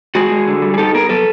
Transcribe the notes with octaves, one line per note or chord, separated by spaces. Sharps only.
G#3 F#4 G#4
G#3
D3
G3
G#4
D#4 G4 A4
B3 G#4 A#4
F#3 A4 B4